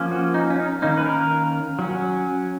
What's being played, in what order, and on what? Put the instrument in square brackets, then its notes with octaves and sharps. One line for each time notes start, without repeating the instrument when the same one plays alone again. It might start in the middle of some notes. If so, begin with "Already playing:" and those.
Already playing: [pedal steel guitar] F3 A#3 C#4
F#4
D#4
C#4
D#4
D#3 A#3 C#4 D#4
B4
A#4
F#3 C#4